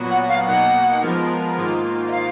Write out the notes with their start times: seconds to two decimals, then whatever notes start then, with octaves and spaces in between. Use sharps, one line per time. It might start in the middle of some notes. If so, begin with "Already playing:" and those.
Already playing: A#2 F#3 B3 F#4
0.10 F#5
0.28 F5
0.46 B2 A#3 D#4 F#5
1.02 F3 G#3 B3 F4 A#4
1.56 G#2 D#3 A#3 F4
2.08 D#5
2.11 F5